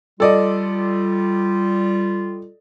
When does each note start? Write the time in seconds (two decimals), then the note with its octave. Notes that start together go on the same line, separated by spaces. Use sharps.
0.20 G3 F4 A4 D5 D#5